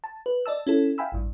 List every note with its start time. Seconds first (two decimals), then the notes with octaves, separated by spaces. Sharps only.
0.04 A5
0.26 B4
0.46 D5 D#5 A5 E6
0.67 C#4 E4 A4
0.98 E5 F5 G5 G#5 B5 E6
1.12 A1 G2